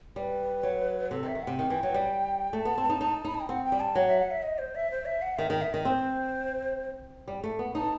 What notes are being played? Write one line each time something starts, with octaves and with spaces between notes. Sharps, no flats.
G3 B4
F#3
C3 A4
D#3
E5
D#3
C3 F#5
D#3 G5
E3
F#3
G3
A3 A5
B3
C4
D#4
D#4
D#4 B5
A5
G5
C4 F#5
G5
G3
A5
F#3 G5
E5
F#5
E5
D#5
C5
E5
C5
E5
F#5
D#3 E5
D#3 G5
E5
D#3 D#5
C4 C5
G3
A3
B3
D#4 A5